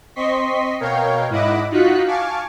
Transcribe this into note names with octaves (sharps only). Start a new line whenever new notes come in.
C4 D#5 C6 C#6 B6
B2 A#4 C#5 F5 G5
G#2 E4 D#5 F#5 B5 D6
D#4 F4 F#4 F#6 B6 C#7
F5 G#5 A5 C#6 D6